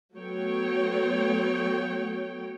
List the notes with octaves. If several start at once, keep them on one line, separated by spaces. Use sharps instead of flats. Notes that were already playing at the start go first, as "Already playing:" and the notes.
F#3 A3 B3 C#5 G5